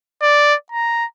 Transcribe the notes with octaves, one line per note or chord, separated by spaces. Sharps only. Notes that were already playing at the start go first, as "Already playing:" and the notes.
D5
A#5